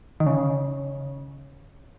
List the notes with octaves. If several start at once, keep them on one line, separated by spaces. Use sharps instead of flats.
D#3
C#3